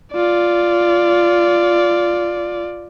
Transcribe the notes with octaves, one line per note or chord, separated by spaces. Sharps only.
F4 D5